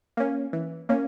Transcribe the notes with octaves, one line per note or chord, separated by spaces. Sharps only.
A#3 C#4
E3
A#3 C#4